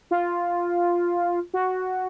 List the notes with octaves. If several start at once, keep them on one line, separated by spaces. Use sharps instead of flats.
F4
F#4